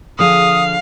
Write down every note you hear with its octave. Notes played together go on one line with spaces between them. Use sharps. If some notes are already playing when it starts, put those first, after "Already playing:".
D3 F3 G#4 F5 D#6